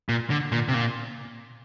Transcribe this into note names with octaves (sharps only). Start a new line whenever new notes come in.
A#2
D3
A#2
C3
A#2